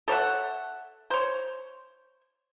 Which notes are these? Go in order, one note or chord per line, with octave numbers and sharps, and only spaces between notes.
A4 C#5 E5 F#5
C5 C#5